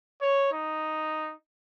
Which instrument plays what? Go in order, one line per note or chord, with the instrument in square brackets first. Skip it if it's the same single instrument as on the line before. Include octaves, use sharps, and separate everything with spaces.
[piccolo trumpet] C#5
D#4